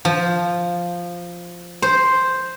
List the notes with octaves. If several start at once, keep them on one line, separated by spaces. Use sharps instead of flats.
F3
C5